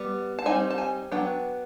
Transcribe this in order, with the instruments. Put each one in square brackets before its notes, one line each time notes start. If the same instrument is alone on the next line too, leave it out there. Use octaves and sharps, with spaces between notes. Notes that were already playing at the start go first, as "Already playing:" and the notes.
Already playing: [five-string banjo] G3 B3
A5
G3 C4 D#4 G#5
A5
G#5
F#3 B3 D4 G5